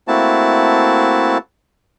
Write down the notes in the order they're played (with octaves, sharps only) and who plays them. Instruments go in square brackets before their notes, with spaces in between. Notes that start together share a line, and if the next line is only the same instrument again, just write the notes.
[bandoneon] A3 A#3 C4 E4 F#4 A5